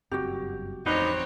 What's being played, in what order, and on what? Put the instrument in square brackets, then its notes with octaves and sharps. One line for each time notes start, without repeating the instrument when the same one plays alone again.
[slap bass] F#1 G2 C4 [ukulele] F#4 G4
[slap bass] A1 F2 [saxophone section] B3 D4 D#4 [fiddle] C4 C#5